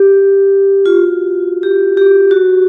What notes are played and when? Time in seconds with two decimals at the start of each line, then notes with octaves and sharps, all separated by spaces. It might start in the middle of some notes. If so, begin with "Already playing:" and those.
Already playing: G4
0.86 F4
0.96 F#4
1.63 G4
1.97 G4
2.31 F#4